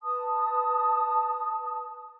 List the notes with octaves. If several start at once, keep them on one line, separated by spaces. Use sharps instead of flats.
B4 A5 D#6